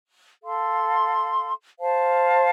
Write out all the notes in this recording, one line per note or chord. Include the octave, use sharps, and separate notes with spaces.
A4 F5 C6
C5 F5 A5